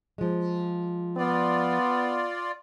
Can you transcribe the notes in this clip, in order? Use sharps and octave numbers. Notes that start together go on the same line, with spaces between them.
F3 G#3
B3 F4 D5